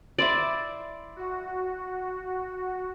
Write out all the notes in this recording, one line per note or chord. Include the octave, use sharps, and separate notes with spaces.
E4 C5 D5 E5
F#4